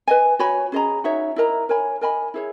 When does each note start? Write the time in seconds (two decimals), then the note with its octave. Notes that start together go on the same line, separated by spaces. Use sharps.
0.08 B4 D#5 G#5
0.39 F#4 C#5 G#5 B5
0.72 C#4 G#4 D#5 A#5
1.04 D#4 F#4 C#5 E5
1.36 E4 A#4 D#5 A#5
1.69 A#4 C#5 G#5 B5
2.01 A#4 D#5 G#5 B5
2.34 E4 G#4 C#5